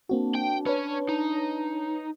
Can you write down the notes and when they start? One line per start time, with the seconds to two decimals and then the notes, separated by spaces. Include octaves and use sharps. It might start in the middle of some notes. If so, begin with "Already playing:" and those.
0.09 A#3 C4 D4 F#4
0.35 G5
0.66 C#4 B4 C#5
1.09 D#4